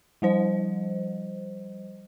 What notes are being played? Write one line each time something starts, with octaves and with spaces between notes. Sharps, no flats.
F3 G3 C5 D#5